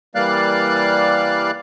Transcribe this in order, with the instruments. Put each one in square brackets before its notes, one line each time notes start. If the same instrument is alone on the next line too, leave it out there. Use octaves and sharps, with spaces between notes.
[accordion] E3 G3 A#3 D5 F5 F#6